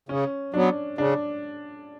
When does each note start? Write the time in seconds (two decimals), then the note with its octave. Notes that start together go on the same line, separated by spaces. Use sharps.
0.09 C#3 C#4
0.54 F#3 B3 D4
0.98 C#3 D4